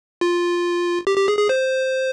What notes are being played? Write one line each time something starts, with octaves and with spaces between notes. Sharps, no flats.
F4
G4
G4
G#4
G#4
C5